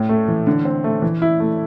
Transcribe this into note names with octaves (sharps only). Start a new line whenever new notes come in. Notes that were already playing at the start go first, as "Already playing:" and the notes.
Already playing: A2
A3
E3
D3
C4
A3
E3
E4
A3